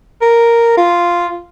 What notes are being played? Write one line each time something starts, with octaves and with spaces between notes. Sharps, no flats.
A#4
F4